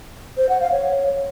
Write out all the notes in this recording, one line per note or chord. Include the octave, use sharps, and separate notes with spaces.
C5
F#5
F5
C#5